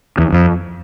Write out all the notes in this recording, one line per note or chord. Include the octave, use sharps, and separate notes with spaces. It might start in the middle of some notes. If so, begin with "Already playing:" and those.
E2
F2